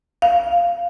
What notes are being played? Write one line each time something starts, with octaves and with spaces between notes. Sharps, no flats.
F5